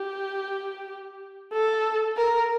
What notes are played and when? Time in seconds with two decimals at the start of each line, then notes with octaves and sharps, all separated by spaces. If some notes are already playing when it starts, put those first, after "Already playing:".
Already playing: G4
1.53 A4
2.17 A#4